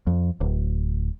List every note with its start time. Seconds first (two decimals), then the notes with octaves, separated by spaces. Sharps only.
0.07 F2
0.41 D1